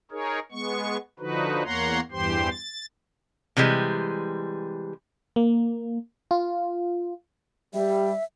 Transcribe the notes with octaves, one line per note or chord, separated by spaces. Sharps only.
D#4 G#4 A#4 C#5
G#3 B3 C#6
D3 F3 D#4 F#4 B4
E2 A#3 C#5 F#5 A#5 C6
E2 G2 E3 G4 C5 C6
A6
C3 E3 G3 G#3
A#3
F4
G3 E5